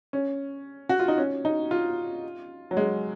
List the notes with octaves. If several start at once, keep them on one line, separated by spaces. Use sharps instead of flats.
C#4
F#4
F4
D#4
C#4
D#4
F4
F#3
G#3